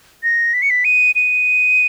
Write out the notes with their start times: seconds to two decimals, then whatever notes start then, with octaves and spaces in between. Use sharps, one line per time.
0.23 A#6
0.54 B6
0.62 C#7
0.70 B6
0.85 D#7
1.15 D#7